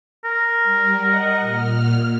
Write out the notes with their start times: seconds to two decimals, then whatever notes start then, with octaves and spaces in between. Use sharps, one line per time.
0.25 A#4
0.63 G3
0.98 D#5 F#5
1.39 A#2 F6